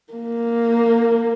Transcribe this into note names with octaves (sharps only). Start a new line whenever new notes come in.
A#3